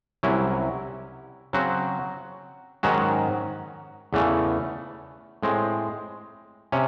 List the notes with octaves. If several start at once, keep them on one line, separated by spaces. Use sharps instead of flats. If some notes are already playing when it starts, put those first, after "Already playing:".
C2 C3 F#3 C#4 E4
C#3 F#3 C4 F#4
G#2 D#3 F#3 C#4 F#4
E2 C#3 E3 A3
A2 G#3 C4
C3 C#4